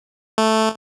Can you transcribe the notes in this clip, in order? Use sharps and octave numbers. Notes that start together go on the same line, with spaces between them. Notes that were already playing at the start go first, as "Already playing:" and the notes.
A3